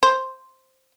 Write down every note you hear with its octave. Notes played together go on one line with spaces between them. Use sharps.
C5